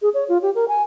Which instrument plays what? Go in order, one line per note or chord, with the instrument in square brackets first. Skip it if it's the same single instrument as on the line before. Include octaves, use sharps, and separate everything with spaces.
[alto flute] G#4
C#5
F4
G4
A#4
G#5